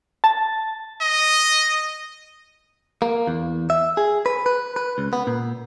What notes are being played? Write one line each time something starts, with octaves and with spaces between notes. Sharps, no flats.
A5
D#5
A#3
E2
E5
G#4
B4
B4
B4
C#2
B3
A#2